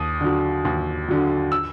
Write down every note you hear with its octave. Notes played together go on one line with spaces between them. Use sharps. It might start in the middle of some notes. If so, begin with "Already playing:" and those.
Already playing: D#2 D#6
D3 F#3
D#2
D3 F#3
E6